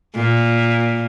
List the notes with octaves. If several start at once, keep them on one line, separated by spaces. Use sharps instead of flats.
A#2